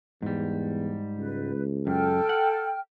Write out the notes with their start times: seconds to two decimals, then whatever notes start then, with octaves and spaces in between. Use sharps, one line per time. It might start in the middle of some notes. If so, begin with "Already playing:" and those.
0.22 E2 G#2 G3
1.19 C#2 B4
1.87 F#2 A4 G5 F6
2.29 F#5